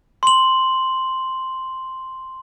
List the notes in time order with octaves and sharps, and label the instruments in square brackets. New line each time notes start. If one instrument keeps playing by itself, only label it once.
[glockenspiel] C6 F#7